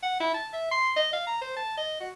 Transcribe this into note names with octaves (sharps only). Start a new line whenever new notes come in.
F#5
E4
A5
E5
C6
D#5
F5
A#5
C5
A5
D#5
F#4